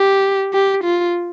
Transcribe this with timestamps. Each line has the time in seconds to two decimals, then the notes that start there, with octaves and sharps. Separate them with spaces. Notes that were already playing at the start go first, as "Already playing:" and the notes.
Already playing: G4
0.53 G4
0.84 F4